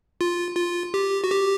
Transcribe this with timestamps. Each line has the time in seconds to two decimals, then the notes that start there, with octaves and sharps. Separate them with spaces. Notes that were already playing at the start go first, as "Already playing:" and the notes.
0.21 F4
0.57 F4
0.94 G4
1.24 F#4
1.31 G4